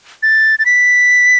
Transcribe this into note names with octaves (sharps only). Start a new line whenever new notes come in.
A6
A6
B6